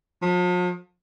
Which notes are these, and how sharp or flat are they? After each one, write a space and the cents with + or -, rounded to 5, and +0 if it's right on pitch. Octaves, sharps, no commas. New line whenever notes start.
F3 +45